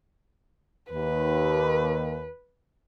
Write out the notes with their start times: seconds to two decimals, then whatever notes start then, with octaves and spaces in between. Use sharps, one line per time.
0.92 D#2 B4